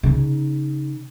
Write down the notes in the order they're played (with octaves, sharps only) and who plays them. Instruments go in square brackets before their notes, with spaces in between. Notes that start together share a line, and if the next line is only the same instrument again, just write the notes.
[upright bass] C#3 D#4